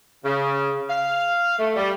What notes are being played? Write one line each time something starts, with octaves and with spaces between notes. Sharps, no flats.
C#3
F5
A3
G3